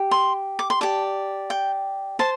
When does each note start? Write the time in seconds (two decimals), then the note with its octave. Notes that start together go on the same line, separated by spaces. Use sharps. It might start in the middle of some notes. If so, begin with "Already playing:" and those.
Already playing: G4
0.11 C6
0.59 D6
0.70 C6
0.81 G4 D5 A5
1.50 G5
2.19 C5 A5